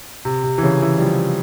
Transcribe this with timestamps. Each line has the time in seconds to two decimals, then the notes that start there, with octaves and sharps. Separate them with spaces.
0.25 C3
0.44 C3
0.58 E3
0.63 C#3
0.82 E3
0.97 G3
1.02 F3